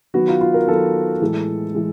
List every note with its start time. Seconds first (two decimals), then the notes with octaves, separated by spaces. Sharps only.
0.14 D#3 F#3 B3 F#4
0.28 F4
0.41 F4
0.54 A#4
0.67 D#3 F#3 B3 A4
1.21 A2 E3 G#3
1.74 E3 G#3